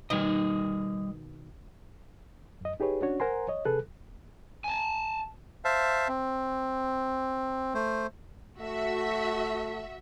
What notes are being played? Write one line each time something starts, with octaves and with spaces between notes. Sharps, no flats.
B2 D#3 G3 D#5
F#2 D#5
D#4 G4 G#4 B4 C#5
C#4 D4 F#4 C#5
A#4 C5 F#5 G#5 A#5 C6
C#5 D#5
C3 G#4 A4 B4 F#6
G#5 A5
C5 E5 F5 A5
C4
A3 C5
A3 F#4 E5